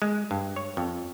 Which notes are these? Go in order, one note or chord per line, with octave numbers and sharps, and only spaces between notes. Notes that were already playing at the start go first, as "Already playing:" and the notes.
G#3
G2
C#5
F2